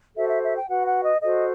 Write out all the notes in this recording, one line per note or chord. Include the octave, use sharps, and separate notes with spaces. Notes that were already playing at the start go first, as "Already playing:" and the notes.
F#4 A4 C5 E5
E5
E5
G5
F#4 B4 F#5
F#5
D#5
F#4 A4 C5 D#5